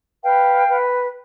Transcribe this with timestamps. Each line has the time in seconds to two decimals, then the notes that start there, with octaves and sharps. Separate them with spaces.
0.23 B4 F5 G5
0.67 B4